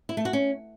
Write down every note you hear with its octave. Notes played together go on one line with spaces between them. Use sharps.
E4
A3
F#4
C#4